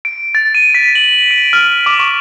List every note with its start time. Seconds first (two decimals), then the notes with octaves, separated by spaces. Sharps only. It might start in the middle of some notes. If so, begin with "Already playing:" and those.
0.05 D7
0.35 A6
0.55 D#7
0.75 B6
0.95 F#7
1.31 D7
1.53 F6
1.86 D6
1.99 C#6